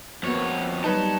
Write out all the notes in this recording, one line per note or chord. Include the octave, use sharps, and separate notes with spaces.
F2 A#3 B3 F#4 C#5
F#3 G3 D#4 B4 C#5 A5